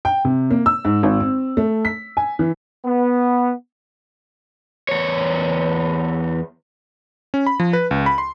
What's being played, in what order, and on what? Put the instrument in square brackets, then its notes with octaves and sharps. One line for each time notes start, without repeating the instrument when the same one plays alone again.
[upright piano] G5
C3
A#3
E6
G#2
G#1
C4
A3
B6
G#5
E3
[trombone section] B3
[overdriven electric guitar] E2 C#5
[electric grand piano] C#4
B5
F3
B4
C#2
B5
C6